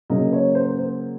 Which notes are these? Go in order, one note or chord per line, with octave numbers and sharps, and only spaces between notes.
C#3 F#3 A#3 D#5
C#5
C5
A#4
C5